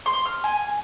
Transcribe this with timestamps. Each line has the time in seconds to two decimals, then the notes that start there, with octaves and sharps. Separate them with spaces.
0.06 C6
0.26 F6
0.44 G#5